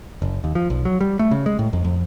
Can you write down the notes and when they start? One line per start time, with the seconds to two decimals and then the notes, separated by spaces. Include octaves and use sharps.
0.22 F#1
0.44 D#2
0.55 F3
0.70 B1
0.85 F#3
1.01 G3
1.19 A3
1.31 C#3
1.46 G#3
1.59 A2
1.73 F2
1.84 F2